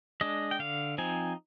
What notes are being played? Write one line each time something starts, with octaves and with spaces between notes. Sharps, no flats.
G#3 D4 D#5
G5
D3 F5
F3 C4 D#4 G#5